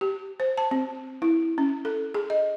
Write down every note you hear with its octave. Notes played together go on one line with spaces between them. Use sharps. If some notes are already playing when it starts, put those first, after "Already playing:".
G4
C5
A5
C4
E4
C#4
A4
G#4
D#5